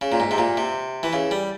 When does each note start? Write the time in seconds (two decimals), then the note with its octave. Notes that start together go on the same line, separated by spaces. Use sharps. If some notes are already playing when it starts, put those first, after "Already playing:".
0.01 C#3
0.12 A#2
0.20 G#2
0.31 C3
0.38 A#2
0.57 C3
1.03 E3
1.13 C#3
1.31 G3